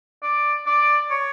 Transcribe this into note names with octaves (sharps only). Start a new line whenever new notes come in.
D5
D5
C#5